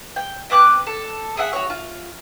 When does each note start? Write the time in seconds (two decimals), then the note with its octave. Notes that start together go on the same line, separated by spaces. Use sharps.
0.16 G5
0.50 C4 B4 D6 F#6
0.87 A4
1.37 G#4 E5 F#5
1.53 F#4 C#5
1.70 F4